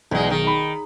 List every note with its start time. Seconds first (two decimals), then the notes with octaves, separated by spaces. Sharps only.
0.11 B1 E2 G#3
0.30 D#3
0.47 B5